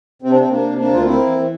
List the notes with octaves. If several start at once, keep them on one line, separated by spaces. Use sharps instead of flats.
C3 C4
D4
C3 C4
A#3 D4
C3
A#3 D4
D2
F4
A#3 C4 E4
E3